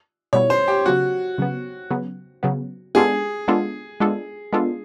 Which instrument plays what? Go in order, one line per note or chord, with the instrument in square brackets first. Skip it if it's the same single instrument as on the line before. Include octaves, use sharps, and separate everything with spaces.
[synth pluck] B2 G3 B3 E4 [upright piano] C#5
[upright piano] C5
G4
[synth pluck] C#3 F#3 B3 [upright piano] F#4
[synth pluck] C#3 F#3 B3
C#3 F#3 B3
C#3 F#3 B3
[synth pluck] G#3 B3 D4 F4 A4 [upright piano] G#4
[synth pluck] G#3 B3 D4 F4 A4
G#3 B3 D4 F4 A4
G#3 B3 D4 F4 A4